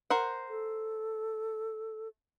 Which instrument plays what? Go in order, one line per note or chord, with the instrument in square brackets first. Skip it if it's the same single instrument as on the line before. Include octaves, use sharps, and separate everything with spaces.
[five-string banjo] A#4 C5 F#5
[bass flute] A4